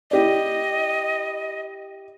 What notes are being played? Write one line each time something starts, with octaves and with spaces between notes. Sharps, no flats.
E4 G4 D5 D#5